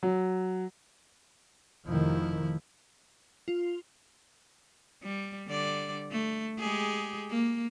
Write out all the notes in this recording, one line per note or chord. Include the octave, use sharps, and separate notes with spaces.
F#3
F1 D#3 F3 E4
F4
G3
D3 G3 D5
A3
G#3 G4 G#4
A#3